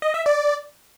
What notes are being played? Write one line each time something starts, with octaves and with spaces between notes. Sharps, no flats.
D#5
E5
D5